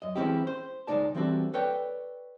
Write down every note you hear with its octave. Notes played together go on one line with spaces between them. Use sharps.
F#2 D#5
E3 G#3 C4 C#4 E4 G4
C5
C#2 G#3 A3 D#4 D5 A5
E3 G3 C4 D4 F#4 A4
A4 B4 C#5 D5 G5